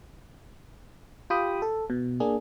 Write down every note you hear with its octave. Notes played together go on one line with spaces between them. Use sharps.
F4 G4 G5 B5 D#6
A4
B2
A#3 D4 G#4